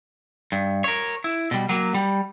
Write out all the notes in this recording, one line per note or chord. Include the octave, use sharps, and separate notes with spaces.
G2
A#4 C#5
E4
B2 G3
F#3 A#3
G3